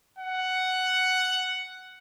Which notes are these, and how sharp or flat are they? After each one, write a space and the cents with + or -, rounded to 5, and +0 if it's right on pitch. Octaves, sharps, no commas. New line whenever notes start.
F#5 +5